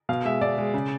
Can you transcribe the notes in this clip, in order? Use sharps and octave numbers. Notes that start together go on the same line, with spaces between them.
B2 F5
G#3 E5
B2 D5
G#3
C#3